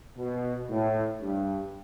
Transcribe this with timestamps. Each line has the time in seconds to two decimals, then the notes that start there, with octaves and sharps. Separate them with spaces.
0.17 B2
0.70 A2
1.22 G2